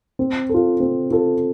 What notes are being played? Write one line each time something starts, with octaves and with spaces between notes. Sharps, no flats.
C4
F4 A4
C4
F4 A4